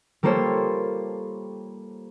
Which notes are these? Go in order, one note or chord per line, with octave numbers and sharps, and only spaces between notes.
G3 A#3 F4 A4 C5 C#5